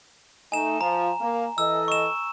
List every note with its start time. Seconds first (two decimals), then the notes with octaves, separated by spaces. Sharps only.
0.52 A3 D#4 G#5 E7
0.81 F3 A#5
1.20 A#3
1.58 E3 A4 D#5 E6
1.88 C#6 E7